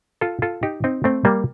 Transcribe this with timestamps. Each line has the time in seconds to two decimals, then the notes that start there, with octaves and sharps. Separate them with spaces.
0.21 F4 A4
0.42 F4 A4
0.63 D#4 G4
0.84 C4 D#4
1.04 A3 C4
1.25 G3 A#3